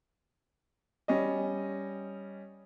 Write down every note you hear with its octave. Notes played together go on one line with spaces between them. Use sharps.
G3 C#4 D#5